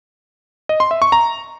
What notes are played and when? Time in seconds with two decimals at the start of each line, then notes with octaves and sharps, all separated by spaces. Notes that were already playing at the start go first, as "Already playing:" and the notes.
0.69 D#5
0.80 C6
0.91 E5
1.02 C#6
1.12 A#5